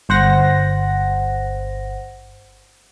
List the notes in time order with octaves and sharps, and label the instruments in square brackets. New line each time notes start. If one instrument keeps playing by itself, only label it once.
[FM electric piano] G1 C5 F#5 A#6